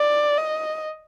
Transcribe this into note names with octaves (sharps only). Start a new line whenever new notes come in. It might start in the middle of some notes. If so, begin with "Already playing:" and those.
Already playing: D5
D#5